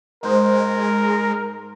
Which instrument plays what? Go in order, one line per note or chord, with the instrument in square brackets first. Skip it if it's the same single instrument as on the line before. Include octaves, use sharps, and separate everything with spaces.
[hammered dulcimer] G#2 C5 [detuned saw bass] G#3 [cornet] A#4